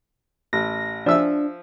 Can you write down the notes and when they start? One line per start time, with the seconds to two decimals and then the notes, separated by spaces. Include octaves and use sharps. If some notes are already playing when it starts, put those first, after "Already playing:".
0.53 A1 A#6
1.06 F3 D4 E5 E6